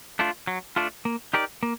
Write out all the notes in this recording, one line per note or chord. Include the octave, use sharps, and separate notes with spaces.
A3 D4 F4
F#3
A3 D4 F4
A#3
D#4 G4 A#4 D5
A#3